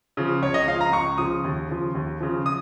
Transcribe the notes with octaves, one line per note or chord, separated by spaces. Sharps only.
C#3 F3
C#2 C#5
D#5
C#3 F3 F5
A#5
C#2 C#6
C#3 F3 D#6
D#2
C#3 F3
D#2
C#3 F3
D#6